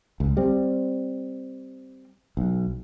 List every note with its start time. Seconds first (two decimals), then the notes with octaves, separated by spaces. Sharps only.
0.20 C#2
0.37 G3 C4
2.37 B1